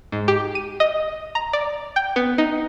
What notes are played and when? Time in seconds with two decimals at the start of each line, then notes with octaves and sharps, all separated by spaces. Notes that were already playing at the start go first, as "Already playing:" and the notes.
0.12 G#2
0.28 G4
0.55 D#7
0.80 D#5
1.35 A#5
1.53 D5
1.96 G5
2.16 B3
2.38 D#4